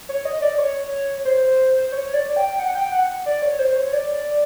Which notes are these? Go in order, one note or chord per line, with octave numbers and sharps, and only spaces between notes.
C#5
D#5
D5
C#5
C5
C#5
D5
G5
F#5
G5
F#5
D5
C#5
C5
C#5
D5